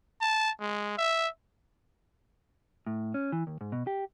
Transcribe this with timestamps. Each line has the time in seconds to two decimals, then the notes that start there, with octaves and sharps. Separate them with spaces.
0.21 A5
0.61 G#3
0.98 E5
2.87 A2
3.14 C#4
3.32 E3
3.47 D#2
3.61 G#2
3.72 B2
3.87 G4